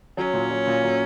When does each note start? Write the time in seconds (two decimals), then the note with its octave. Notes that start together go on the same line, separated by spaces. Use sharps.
0.17 F#3 C#4
0.34 A#2
0.51 F#3
0.67 A#2
0.83 F#3